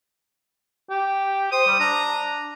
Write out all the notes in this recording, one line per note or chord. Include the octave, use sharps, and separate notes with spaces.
G4
C5 D#6
G3
D4 A#5